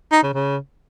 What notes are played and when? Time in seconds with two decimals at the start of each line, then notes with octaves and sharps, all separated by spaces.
0.12 D#4
0.23 C#3
0.34 C#3